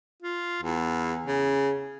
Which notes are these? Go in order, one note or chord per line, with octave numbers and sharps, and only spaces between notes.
F4
E2
C#3